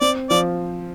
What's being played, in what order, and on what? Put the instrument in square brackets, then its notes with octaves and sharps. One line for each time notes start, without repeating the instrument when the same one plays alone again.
[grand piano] C4 [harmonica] D5
[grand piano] F3 [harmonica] D5